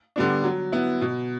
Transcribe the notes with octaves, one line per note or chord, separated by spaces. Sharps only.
D3 G3 B3 D4
F#3
B3 E4
B2